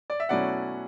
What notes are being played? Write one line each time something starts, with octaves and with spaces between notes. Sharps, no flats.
D5
E5
B2 F#3 A3 C#4 E4 D5 F#5